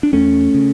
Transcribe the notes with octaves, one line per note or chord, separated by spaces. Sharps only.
D4
E2 A3 C#4
C#3